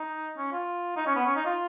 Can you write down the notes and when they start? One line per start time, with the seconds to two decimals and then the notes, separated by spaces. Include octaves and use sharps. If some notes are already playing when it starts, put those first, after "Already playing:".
Already playing: D#4
0.38 C#4
0.52 F4
0.96 D#4
1.07 C#4
1.16 B3
1.26 C#4
1.36 D#4
1.46 F4